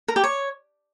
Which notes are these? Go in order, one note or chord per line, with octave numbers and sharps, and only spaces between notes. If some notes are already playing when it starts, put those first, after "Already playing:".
A#4
G4
C#5